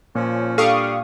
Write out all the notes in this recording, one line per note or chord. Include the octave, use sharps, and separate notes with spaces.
A#2 F3 C#4
G3 D4 A4 F5 C#6 D#6